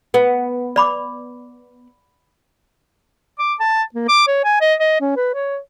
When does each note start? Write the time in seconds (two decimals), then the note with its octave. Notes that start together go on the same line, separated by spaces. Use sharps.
0.14 B3
0.76 D5 B5 D6
3.39 D6
3.60 A5
3.94 A#3
4.08 D6
4.27 C#5
4.44 G#5
4.61 D#5
4.80 D#5
5.01 C#4
5.16 B4
5.34 C#5